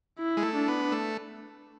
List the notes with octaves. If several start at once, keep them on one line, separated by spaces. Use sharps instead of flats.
E4
G#3
A3
D4
B3
A3